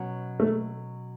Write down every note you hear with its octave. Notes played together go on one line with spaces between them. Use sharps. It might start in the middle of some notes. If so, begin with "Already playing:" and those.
Already playing: B2 F#3 C#4
A3